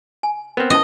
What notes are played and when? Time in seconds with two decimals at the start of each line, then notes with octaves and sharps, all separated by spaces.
0.23 G#5
0.57 B3 C4 A#4 B4
0.70 C#4 E4 D#5 A5